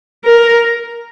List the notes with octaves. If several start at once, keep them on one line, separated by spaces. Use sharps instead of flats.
A#4